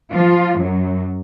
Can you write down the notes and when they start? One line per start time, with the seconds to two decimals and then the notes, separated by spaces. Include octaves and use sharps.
0.13 F3 F4
0.59 F#2 F#3